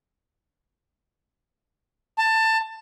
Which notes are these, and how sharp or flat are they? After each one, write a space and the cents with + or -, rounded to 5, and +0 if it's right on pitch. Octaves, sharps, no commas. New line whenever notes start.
A5 +20